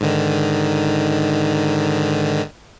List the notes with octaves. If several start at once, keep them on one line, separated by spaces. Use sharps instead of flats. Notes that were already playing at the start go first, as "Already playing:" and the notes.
G#2 D3 D#3